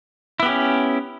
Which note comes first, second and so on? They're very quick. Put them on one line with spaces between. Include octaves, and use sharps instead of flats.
E4 B3 G4 C#4